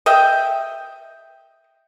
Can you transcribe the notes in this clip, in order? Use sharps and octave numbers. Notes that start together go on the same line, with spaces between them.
D#5 E5 G5